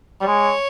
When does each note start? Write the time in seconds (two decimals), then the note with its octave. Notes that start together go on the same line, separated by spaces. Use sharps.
0.21 G3
0.27 G#3 C#5